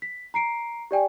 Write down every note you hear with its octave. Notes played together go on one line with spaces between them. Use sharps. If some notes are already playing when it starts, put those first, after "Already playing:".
B6
A#5 C7 D7
G4 D5 G5 G#5